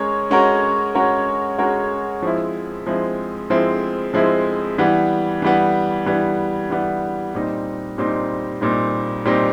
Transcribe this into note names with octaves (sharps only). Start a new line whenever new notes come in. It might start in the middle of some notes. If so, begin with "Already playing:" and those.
Already playing: G#3 C#4 A#4 C#5
G#3 C#4 F#4 A#4 C#5
G#3 C#4 F#4 A#4 C#5
G#3 C#4 F#4 A#4 C#5
F3 G#3 C4 E4
F3 G#3 C4 E4
F3 G#3 C4 E4
F3 G#3 C4 E4
E3 G3 B3
E3 G3 B3
E3 G3 B3
E3 G3 B3
A#2 G3 C4 D#4
A#2 G3 C4 D#4
A#2 G3 C4 D#4
A#2 G3 C4 D#4